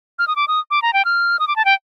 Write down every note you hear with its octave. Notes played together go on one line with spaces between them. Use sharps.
F6
D#6
D6
D#6
D6
A#5
G5
F6
D#6
D6
A5
G5